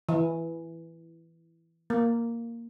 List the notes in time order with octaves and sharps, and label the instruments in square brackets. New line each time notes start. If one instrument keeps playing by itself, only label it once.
[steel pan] E3
A#3